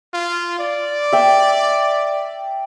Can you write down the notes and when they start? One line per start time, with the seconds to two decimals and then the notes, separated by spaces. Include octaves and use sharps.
0.14 F4
0.59 D5
1.12 E5 G5